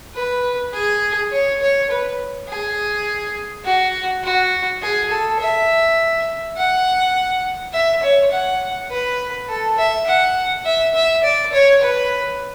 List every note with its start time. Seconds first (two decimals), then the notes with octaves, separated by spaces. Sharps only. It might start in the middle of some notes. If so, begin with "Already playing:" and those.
0.15 B4
0.73 G#4
1.32 C#5
1.61 C#5
1.90 B4
2.48 G#4
3.65 F#4
4.23 F#4
4.82 G#4
5.11 A4
5.40 E5
6.57 F#5
7.73 E5
8.03 C#5
8.32 F#5
8.91 B4
9.48 A4
9.78 E5
10.07 F#5
10.66 E5
10.95 E5
11.24 D5
11.53 C#5
11.82 B4